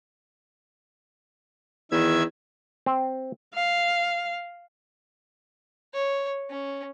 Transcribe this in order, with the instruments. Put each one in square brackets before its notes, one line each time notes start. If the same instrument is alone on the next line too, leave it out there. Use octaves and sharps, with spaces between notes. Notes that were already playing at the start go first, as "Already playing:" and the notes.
[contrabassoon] E2 [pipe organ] D#3 E5 G#6
[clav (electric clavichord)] C4
[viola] F5
[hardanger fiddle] C#5
C#4